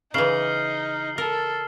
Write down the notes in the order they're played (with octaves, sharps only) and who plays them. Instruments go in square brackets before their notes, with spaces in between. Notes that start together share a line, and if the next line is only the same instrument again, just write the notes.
[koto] C#3 E3 [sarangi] D#4 [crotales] F6 C7 F#7
[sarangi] A4 [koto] A#4 [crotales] F6